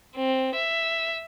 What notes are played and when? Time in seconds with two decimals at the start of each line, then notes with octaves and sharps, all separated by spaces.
0.16 C4
0.56 E5